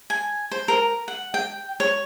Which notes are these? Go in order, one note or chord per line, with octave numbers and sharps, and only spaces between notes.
G#5
C5
A#4
F#5
G5
C#5